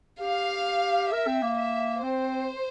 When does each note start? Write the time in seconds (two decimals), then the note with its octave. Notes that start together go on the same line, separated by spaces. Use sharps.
0.20 G4 F5
1.12 A#4 E5
1.27 C4
1.42 A#3
1.58 E5
2.03 C4 C5